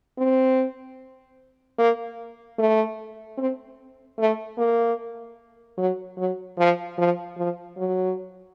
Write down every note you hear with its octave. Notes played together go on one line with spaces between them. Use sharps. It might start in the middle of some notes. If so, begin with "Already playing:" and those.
C4
A#3
A3
C4
A3
A#3
F#3
F#3
F3
F3
F3
F#3